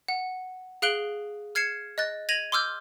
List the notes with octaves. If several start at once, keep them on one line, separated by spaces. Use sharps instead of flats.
F#5
G#4 F5 F#6 D7 F#7 G7
F6 G#6 C7 C#7 E7
D#5 F#6 A6
G#6 A#6 D#7 F7 F#7
C6 D6 E6 F6 G6